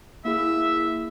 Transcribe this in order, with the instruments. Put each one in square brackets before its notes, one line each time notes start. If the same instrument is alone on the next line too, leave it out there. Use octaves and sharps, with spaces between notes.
[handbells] A#3 E4 G#4 [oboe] E5